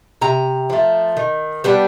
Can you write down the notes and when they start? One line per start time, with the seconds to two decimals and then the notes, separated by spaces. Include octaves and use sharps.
0.21 C3 A#5
0.70 F3 A3
1.17 D#3
1.64 G3 B3 D4